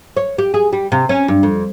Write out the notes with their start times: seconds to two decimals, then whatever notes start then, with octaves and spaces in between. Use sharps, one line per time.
0.17 C#5
0.38 G4
0.54 G#4
0.73 G3
0.92 C3
1.09 C#4
1.28 G2
1.43 F2